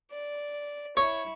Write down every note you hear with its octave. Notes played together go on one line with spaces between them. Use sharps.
D5
E4 C#5 C#6